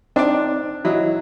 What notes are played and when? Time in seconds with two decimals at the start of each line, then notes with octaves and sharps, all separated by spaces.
0.16 C4 D4 D#4 D5
0.85 F#3 E4 D#5